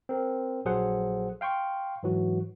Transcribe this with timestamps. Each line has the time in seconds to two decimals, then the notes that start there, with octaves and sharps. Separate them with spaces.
0.09 C4 A#4
0.65 A#1 F#3 G#4 A4 C5 F#5
1.41 F5 G5 C6 C#6
2.03 G#2 E3 F#3 F#4